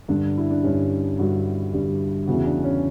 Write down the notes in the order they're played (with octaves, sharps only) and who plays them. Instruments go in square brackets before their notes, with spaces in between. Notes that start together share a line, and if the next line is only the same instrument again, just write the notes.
[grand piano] G2 D3 G3 D4
E4
D4
G2 D3 G3 C#4
G2 D3 G3 F#4
G2 D3 G3
E2 C#3 E3 F#4
D4
C#4